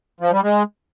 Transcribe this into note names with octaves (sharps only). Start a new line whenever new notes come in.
F3
G3
G#3